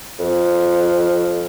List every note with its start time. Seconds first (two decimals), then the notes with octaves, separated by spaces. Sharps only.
0.19 F2